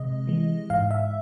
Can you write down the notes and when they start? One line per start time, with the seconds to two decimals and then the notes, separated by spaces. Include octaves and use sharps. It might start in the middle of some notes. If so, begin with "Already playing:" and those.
Already playing: C3 G#3 D#5
0.27 E3 G#3
0.70 G#2 F5
0.91 E5